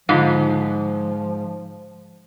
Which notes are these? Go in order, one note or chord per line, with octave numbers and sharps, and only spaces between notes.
G#2 D3 F3 F4 F5